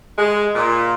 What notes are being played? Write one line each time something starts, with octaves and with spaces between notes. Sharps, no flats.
G#3
A#2